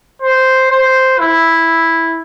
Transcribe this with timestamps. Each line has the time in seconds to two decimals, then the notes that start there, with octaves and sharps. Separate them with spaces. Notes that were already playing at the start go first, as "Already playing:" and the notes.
0.22 C5
0.71 C5
1.19 E4